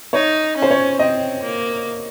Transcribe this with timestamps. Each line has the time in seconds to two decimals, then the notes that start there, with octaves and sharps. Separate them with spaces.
0.13 D#4 C#5
0.57 C#4
0.62 C5
0.71 C#5
0.99 C4 D#5
1.42 A#3